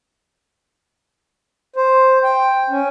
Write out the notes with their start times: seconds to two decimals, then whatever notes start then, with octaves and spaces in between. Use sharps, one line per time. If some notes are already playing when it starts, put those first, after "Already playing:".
1.76 C5
2.24 G5
2.70 C#4